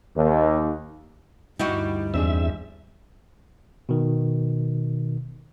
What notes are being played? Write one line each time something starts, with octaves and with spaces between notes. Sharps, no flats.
D#2
D2 G2 G3 D#4 E4 F#4
E2 C4 D4 G#4 E5
B2 D#3